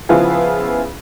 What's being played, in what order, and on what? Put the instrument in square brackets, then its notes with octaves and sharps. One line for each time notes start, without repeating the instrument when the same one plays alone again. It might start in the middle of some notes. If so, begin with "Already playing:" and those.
[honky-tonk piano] C#3 F3 B3 E4 F4 G#4